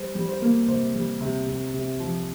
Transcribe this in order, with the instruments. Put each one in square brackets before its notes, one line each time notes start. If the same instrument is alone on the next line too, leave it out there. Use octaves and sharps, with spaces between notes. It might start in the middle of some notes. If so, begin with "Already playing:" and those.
Already playing: [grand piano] G3 C5
G3
C5
A#3
C3 C5
G3
C3
C3
C3
F3